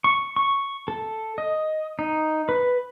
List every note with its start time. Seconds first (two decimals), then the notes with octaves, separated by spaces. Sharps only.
0.04 C#6
0.36 C#6
0.88 A4
1.38 D#5
1.99 D#4
2.49 B4